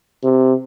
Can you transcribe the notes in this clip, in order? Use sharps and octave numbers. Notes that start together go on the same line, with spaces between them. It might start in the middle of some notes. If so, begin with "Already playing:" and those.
C3